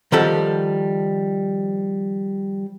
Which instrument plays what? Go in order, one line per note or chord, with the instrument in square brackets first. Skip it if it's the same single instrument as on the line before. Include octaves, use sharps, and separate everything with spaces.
[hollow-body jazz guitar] D#3 F3 G3 A4 F#5